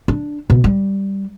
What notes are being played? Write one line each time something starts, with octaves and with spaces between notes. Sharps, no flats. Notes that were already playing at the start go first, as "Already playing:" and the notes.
D4
B2
G3